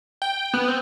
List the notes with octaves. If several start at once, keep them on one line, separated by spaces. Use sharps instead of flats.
G5
B3
C4